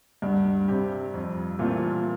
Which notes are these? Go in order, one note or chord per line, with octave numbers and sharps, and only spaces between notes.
D2 G2
C3 G3 C4 G4
F2
A#2 E3 A3 C4 F4